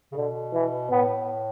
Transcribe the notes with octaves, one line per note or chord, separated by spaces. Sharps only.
C#3
B2 D3
E3
A2 B3